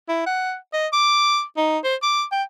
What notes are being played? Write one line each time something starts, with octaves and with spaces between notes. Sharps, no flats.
E4
F#5
D#5
D6
D#4
C5
D6
G5